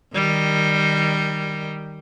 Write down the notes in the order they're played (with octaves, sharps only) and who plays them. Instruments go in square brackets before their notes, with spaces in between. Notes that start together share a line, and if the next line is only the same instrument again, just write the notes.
[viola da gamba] D#3 G3